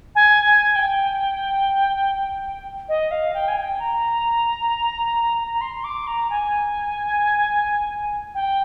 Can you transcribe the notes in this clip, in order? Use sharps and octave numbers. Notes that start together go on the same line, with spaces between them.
G#5
G#5
G5
D#5
F5
G5
G#5
G5
A#5
A#5
C6
D6
A#5
G#5
G5